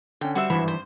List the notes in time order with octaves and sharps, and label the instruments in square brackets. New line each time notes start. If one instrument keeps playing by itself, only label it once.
[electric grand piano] D3 C#4 [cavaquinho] G5
[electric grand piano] G3 [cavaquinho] F#4 C5 E5
[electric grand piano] G#1 G2 B5 [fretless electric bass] E3
[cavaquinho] C5